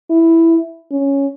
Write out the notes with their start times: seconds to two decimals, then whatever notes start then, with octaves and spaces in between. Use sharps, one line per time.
0.10 E4
0.92 C#4